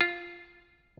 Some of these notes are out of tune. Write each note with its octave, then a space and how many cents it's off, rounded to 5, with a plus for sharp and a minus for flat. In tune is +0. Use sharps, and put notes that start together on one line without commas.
F4 -5